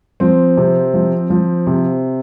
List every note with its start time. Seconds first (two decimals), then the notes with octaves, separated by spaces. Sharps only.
0.20 F3 C4
0.57 C3
0.94 F3
1.30 F3
1.67 C3